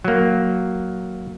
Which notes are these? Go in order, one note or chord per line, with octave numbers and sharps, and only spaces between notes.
F#3 A#3